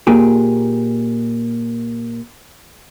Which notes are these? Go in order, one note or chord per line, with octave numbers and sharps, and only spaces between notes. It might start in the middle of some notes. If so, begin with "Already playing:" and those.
A#2 G4 G#4